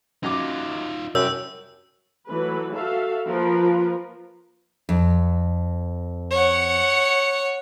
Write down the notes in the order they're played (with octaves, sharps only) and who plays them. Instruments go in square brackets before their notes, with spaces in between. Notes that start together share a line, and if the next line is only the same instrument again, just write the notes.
[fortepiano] F#2 F#3 D6 [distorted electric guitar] D#4 F4
[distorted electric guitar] C2 G4 [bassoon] F#2 [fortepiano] C#5 [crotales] E6 G6
[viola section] E3 F#3 A3 B4
F#4 A4 E5 F5
F3 A#3 A#4 B4
[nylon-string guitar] F2
[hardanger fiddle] C#5 F#5